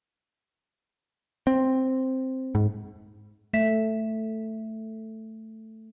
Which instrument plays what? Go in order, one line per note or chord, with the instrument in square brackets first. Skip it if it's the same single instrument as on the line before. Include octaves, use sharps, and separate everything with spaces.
[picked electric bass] C4
G#2
[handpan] A3 [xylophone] E5 E7